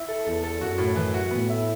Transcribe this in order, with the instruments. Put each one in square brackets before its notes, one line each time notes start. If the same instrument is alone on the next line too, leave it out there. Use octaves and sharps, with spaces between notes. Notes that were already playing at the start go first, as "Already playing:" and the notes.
Already playing: [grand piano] E4
A4
[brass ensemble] E2 [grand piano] A4
[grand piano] A4
[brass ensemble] F#2 [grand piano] F#4
[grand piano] A2
E3
F#4
[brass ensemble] A2 [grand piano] B3
[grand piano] E4